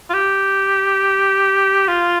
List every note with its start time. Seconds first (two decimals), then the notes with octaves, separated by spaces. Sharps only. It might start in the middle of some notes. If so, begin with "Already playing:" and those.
0.10 F4
0.14 G4
1.88 F4